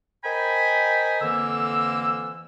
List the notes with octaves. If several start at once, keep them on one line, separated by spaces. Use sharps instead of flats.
A#4 C5 D#5 G5 G#5 B5
F2 D3 E3 A#3 E6